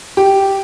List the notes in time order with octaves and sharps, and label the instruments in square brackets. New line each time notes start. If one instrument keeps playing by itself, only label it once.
[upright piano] G4